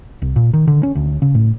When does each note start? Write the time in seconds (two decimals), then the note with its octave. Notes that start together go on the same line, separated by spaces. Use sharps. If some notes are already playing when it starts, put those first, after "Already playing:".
0.22 C2
0.36 A#2
0.53 D#3
0.67 D3
0.83 C#4
0.95 D2
1.22 C#3
1.35 A2